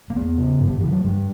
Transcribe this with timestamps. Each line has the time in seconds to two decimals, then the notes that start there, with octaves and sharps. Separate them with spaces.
0.10 A#3
0.16 E2 B3
0.38 C#3
0.60 G2
0.68 D3
0.80 D3 E3
0.92 F#3
1.04 G2 G3